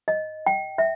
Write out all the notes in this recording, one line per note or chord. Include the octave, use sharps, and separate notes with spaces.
D#5
G5
E5